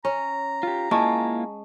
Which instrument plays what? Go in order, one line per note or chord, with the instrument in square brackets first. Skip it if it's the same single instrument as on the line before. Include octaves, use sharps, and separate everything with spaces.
[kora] C#4 [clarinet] A#5
[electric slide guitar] F4 G4
[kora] G#3 [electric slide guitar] A#3 E4 F4 [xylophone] G#5 A5 C#6